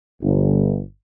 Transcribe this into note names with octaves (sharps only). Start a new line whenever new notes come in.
G1